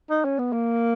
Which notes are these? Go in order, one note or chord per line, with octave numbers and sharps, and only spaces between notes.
D#4
C#4
B3
A#3